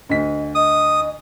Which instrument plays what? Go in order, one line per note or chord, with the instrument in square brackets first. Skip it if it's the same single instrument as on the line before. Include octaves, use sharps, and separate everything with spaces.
[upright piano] D2 B6 [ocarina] D#5
[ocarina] D#5 [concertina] D#6